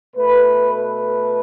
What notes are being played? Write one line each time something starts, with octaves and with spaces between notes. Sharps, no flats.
B2 A3 B4
B4